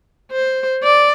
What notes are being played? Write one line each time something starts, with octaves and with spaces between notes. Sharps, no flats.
C5
D5